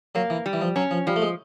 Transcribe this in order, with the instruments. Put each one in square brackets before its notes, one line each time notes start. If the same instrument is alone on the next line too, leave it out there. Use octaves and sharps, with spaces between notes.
[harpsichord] F#3 [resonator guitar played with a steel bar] A#3
[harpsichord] E3
[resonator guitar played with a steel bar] G3
[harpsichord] E3
F3
[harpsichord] F#3 [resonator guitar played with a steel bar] C#4
[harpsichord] F3
[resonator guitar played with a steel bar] F3 [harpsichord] G3
[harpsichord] A3
G#3